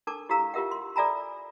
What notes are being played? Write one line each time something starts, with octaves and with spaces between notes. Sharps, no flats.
D4 A4 A#4 A5 D6
E4 G4 A4 F5 A#5 E6
F4 G4 A#4 E5 F#5
C6
A4 D5 E5 G#5 A#5 B5